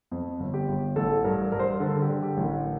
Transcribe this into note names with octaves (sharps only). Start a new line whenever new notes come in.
F2
G1
G4
G1
A1 A4
G2 A#4
G2 A#4
C5
A#4
D3 A4
G4
D3
G4
A1
A#4